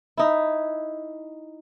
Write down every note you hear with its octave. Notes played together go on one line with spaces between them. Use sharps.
D#4 E4